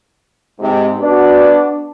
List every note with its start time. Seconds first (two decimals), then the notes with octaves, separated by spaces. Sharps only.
0.60 G#2 C3
0.99 B3 D4 F#4 D5